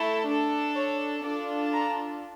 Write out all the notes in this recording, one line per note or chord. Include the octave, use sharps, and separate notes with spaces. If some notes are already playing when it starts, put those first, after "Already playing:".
Already playing: A3 E4 A4
D4 A4
C#5
D4 F4 A4 D5
A#5